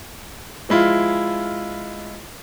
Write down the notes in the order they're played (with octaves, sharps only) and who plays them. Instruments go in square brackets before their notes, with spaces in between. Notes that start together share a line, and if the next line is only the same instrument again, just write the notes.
[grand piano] F3 G#3 E4 F4